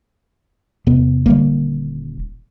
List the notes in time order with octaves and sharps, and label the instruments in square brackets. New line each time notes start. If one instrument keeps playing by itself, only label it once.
[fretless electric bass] E2 C3 B3
[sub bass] D#1 [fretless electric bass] D3 G3 A#3